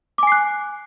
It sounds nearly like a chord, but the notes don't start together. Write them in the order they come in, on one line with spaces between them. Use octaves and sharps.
D6 G#5 C7 F#6